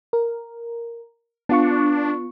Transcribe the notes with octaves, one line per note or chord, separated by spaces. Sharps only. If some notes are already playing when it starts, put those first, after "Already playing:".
A#4
B3 D4 F4 C#6